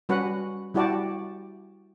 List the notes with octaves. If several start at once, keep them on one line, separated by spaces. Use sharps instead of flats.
G3 C#4 F#4 B4 F#5
G3 E4 F#4 G4 D5 A5